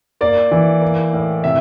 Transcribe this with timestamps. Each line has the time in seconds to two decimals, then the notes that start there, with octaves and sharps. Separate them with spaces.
0.21 A#3 D5
0.51 E3
0.82 A#3
1.13 A2
1.44 C3 E5